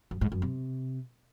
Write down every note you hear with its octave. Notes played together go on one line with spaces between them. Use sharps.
F#2
G#2
F#2
C3